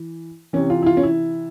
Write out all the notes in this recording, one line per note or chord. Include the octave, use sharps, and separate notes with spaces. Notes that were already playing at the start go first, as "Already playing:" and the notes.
Already playing: E3
C3 E3 C#4
F4
E4
F4
C#4
E4